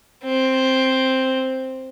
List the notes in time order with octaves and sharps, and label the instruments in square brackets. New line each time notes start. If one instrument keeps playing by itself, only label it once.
[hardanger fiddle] C4